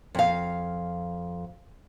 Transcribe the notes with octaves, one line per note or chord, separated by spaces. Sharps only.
F2 F5